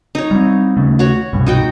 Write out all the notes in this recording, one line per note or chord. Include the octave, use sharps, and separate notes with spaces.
D#4 C#5
G3 C4
D#2 C#3 A3
F#4 C#5
C2 G2 B2
D#4 F#4 G5